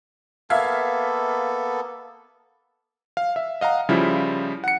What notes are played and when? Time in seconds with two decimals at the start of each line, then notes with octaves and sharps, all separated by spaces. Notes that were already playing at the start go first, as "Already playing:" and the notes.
0.50 A#3 B3 A4 E5 F5 G#6
3.17 F5
3.36 E5
3.61 D#5 F5 F#5 A#5
3.89 C#3 F3 G3 E4 F4
4.64 F#5 C#7